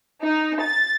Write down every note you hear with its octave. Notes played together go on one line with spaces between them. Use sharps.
D#4
A6